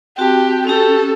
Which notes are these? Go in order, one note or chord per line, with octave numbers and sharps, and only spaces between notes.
C4 F#4 G4 A5
C#4 G4 A4